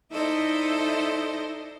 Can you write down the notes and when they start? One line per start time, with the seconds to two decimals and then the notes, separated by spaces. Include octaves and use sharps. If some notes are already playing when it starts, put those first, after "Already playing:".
0.11 D#4 E4 A4 C5 D5 D#5